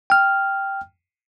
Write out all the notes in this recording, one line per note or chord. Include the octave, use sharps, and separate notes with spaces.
G5 F6